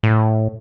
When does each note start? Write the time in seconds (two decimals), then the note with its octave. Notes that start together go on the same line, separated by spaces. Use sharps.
0.03 A2